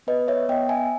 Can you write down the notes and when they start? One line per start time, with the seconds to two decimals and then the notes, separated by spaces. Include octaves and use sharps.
0.07 B3 B4 D#5
0.28 C#5 E5
0.48 B3 D#5 G5
0.69 E5 G#5